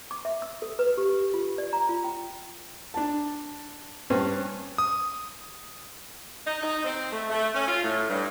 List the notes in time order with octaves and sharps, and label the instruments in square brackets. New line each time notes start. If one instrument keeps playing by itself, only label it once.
[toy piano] D6
E5
E6
A4
B4
G4
G4
F4
D5
A#5
F4
G5
[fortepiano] D4 A5
G2 C#4 B4 C5
[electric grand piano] D#6
[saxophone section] D#4
D#4
C4
A3
A3
C#4
F4
A2
G2